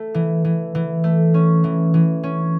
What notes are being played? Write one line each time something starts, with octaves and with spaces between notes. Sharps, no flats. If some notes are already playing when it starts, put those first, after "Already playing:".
Already playing: A3
E3
E3
E3
A3
C#4
E3
E3
C#4